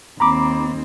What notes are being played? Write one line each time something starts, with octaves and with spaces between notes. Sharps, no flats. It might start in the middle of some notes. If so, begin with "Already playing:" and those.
D#2 C4 A#5 B5 D6